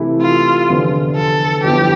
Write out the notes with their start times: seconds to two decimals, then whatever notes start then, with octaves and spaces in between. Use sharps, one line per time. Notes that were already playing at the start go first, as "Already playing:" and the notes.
Already playing: C3 E3 A3 E4 G4
0.21 F4
0.69 F1 E2 D3
1.16 A4
1.63 G1 F2 E3 B3 G4